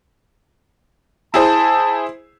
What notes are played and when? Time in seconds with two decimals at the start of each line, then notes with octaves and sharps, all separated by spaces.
1.34 E4 G#4 C5 A5